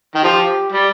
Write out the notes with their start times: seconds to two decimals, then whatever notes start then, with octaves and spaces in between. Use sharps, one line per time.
0.15 D#3
0.23 F3 G4
0.72 G3